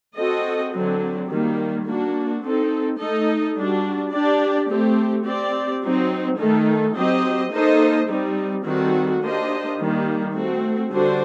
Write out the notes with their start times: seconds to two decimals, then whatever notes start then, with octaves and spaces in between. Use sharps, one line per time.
0.16 C4 F#4 A4 D#5
0.73 D3 F#3 C4
1.30 D#3 G3 A#3
1.86 A#3 D4 F#4
2.43 C4 D#4 A4
2.99 A3 D#4 A4 D#5
3.56 G3 D4 F#4
4.12 D4 G4 D5
4.69 A3 C4 G4
5.26 C4 G4 D5
5.82 F#3 C4 D#4
6.38 D#3 A3 D#4 A4
6.95 F#3 C4 G4 C5 D#5
7.51 A#3 D#4 A4 C5 D#5
8.08 G3 C4 D#4
8.65 D#3 G3 C4 F#4 A4
9.21 A#3 D4 G4 C5 D#5
9.79 D#3 G3 A#3
10.34 A3 C4 F#4
10.92 D3 G3 D4 F#4 C5